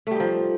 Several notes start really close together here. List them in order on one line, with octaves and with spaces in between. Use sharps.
A3 G3 D#4 F3